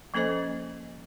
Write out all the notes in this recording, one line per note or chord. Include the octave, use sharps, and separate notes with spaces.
F3 A#3 C#4 A4 C5 D#5